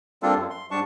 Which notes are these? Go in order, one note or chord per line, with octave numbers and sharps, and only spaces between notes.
G3 A#3 C4 D4 F4 A4
F#2
C6
G#2 G3 D4 A5 C#6